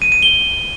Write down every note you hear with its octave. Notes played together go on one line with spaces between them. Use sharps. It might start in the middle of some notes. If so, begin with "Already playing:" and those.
D#7
D#7
G7